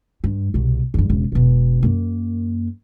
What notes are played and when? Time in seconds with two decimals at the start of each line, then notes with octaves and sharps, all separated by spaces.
0.24 G2
0.54 C2 B2
0.94 E2 G2
1.10 E1 C#3
1.32 E1 B2
1.83 F#2 A#3